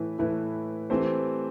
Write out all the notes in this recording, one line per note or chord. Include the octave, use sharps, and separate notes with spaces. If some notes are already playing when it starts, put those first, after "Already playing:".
Already playing: A2 E3 A3 E4 B4
A2 E3 A3 E4 B4
E3 A3 C4 G4 C5